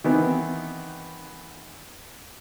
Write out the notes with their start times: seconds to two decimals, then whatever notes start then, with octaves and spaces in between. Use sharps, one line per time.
0.04 D#3 E3 B3 C4